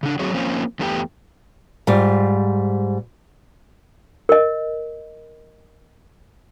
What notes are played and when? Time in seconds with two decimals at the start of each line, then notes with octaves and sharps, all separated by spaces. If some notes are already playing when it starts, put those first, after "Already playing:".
0.03 C#3 D4
0.19 F#3 C4 F#4 G#4 C#5
0.34 F3 A#3 C4 C#4
0.79 E2 A3 B3 D4 G4 G5
1.87 G#2 G3 F4
4.29 A#4 D#5